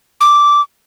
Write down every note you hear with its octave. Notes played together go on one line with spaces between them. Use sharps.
D6